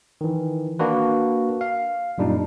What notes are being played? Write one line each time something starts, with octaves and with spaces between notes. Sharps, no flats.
D#3 E3
A#3 D4 F#4 B4
F5
F#2 A#2 G3 D4 D#4